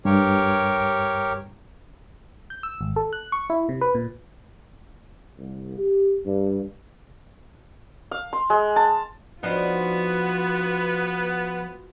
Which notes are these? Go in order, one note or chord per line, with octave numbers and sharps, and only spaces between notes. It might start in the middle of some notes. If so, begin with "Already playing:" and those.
G2 G4 A#4 C#5
G6
E6
G#1
A4
F#6
C#6
E4
C3
B4
A#2
C2
G4
G2
F5
C6
G#3
A5
F3 B3 D4 D#4 F4 F#4